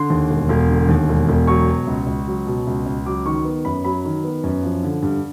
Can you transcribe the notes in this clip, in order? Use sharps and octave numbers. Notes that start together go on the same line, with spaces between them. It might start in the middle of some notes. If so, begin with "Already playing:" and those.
Already playing: D3 C6
D#2
E1
E1
D3
D#2
E1
E1
F#3 C#6
B2
C#2
C#2
F#3
B2
C#2
C#2
F#3 D6
D#3 C#6
B3
F#2 B5
F#3 B5
D#3
B3
F#2
F3
D3
G2